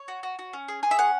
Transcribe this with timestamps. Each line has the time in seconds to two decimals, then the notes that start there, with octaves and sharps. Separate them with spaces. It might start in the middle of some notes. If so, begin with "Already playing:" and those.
Already playing: C#5
0.08 F#4
0.23 F#4
0.39 F#4
0.53 C#4
0.68 G#4
0.83 G#4
0.91 E5
0.99 C#4 F#5